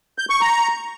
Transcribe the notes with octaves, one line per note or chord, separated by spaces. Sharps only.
G6
C#6
A#5